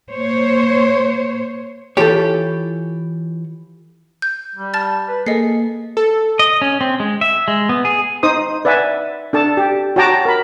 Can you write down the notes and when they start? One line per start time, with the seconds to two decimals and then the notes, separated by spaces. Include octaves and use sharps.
0.11 A#3 C5 C#5
1.97 E3 F4 G4 A4 C#5
4.22 G6
4.56 G3
4.74 A5 F6 A6
5.08 B4
5.26 A#3 G#4 A4 D#5 C7
5.97 A4
6.39 D#5
6.62 C#4
6.81 C4
7.00 G#3
7.21 E5
7.48 G#3
7.69 B3
7.85 G#4
8.23 D#4 C5 D#6
8.65 B4 D5 E5 F#5 G#5
9.33 D4 A4 A5
9.57 G4
9.96 F#4 C#5 G5 A5 A#5 D6
10.25 A#4 B5